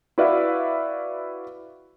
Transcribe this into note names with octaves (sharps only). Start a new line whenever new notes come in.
E4 F#4 B4 D5 E5 F5